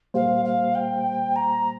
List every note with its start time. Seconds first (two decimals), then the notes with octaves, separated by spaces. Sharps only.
0.14 A#2 G3 A#3 G4 C5 F5
0.45 F5
0.75 G5
1.36 A#5